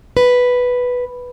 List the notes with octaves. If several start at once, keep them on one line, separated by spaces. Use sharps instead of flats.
B4